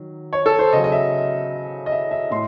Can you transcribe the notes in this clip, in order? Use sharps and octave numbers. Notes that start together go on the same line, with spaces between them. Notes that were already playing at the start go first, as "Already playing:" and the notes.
Already playing: D#3 F#3
C#5
A4
C5
C#3 F#3 D#5
D#5
E5
D#5
E5
E5
A2 C6